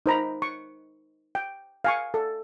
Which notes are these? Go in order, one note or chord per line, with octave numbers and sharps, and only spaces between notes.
D#4 C5 A#5 B5
C#6
G5
F5 G#5 C#6
A4